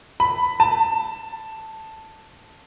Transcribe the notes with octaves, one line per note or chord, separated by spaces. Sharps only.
B5
A5